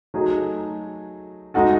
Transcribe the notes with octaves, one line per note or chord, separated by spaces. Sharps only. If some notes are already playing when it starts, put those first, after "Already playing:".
F#3 A3 D#4 G#4
G#3 D#4 F#4 A4